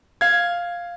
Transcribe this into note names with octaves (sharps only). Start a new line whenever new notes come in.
F5 G#6